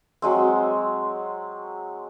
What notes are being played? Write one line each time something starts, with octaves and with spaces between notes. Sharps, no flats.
F#3 G#3 C4